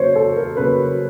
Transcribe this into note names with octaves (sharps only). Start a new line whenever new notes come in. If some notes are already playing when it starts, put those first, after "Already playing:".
Already playing: C#3 F#3 A#3 C5 C#5
A4
A#4
C#3 F#3 A#3 B4